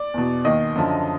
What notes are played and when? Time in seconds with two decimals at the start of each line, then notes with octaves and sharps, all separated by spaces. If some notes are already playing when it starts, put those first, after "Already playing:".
Already playing: D5
0.14 E2 B2
0.45 D#2 D#3 D#5
0.75 F#2 D3 F3